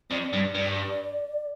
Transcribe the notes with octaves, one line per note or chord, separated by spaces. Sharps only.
F2 D5
G2
G2